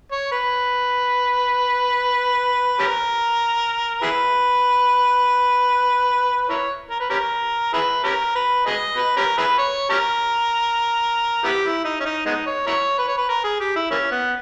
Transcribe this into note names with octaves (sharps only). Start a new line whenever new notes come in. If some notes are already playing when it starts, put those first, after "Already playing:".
C#5
B4
C#4 G4 A#4
E4 G#4 B4
E4 A#4 C#5
A#4
B4
C#4 G4 A#4
E4 G#4 B4
C#4 G4 A#4
B4
G#4 B4 D#5
B4
C#4 G4 A#4
E4 G#4 B4
C#5
C#4 G4 A#4
B3 E4 G4
E4
D#4
C#4
D#4
G#3 B3 D#4
C#5
E4 A#4 C#5
B4
C#5
B4
A#4
G#4
G4
E4
E3 A#3 C#4
B3